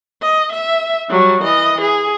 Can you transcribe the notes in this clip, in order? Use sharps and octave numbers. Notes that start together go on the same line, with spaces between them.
D#5
E5
F#3 G3
E3 D#5
G#4